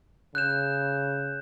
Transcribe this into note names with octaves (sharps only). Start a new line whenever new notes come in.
C#3 F#6 G6 E7